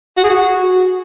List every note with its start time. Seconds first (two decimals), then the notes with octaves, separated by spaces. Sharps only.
0.17 F#4
0.24 G#4
0.30 F#4